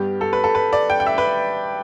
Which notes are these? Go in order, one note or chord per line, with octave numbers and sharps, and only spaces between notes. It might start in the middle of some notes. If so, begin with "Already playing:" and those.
Already playing: G2 G3 B3 G4
A4
B4
A4
B4
D5
G5
G5
E5
B4